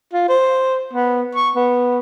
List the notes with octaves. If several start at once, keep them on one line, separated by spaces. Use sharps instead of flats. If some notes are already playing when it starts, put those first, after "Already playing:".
F4
C5
B3
C#6
B3